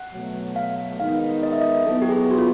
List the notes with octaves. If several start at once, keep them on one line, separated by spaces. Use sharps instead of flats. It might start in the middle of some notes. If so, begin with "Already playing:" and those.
Already playing: F#5
B2 F#3 A3
F5
D#3 G#3 B3 D#4 F5
D#5
E5
D#5
F#3 B3 E4 A4
G4
G#4
F#4
F4